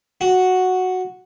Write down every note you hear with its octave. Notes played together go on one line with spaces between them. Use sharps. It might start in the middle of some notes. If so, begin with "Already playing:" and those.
F#4